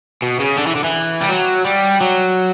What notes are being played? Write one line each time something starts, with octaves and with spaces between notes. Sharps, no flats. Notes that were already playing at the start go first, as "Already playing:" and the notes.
B2
C#3
D3
E3
D3
E3
G3
F#3
G3
F#3